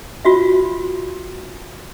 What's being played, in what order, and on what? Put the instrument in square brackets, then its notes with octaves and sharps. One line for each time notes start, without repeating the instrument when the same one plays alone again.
[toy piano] F4 F#4 E5